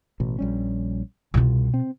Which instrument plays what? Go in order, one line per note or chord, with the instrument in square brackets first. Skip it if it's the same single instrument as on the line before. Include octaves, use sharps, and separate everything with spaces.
[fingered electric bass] A1 B2
A#1 G3 C#4
[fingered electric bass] C2 [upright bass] B2 F4
[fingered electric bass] C4